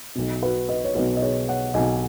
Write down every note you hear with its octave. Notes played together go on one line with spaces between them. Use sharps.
B1 B2
F#4 B4
B4 D#5
C#5
B1 B2 F#4 B4
D#5
G#4 C#5
C#5 F#5
B1 B2 D#5 G#5